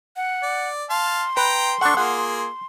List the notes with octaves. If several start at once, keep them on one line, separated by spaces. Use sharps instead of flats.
F#5
D5
F5 A5 C6
B4 G5 A#5
D4 A4 F#5 C#6
A#3 F4 G#4 F#5